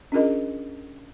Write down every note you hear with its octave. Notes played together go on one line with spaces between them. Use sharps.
C#4 D4 F4 G#4 A#4 D#5